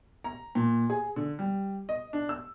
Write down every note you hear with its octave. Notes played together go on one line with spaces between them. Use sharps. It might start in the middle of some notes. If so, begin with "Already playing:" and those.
A#5
A#2
G#4
D3
G3
D#5
D4
E6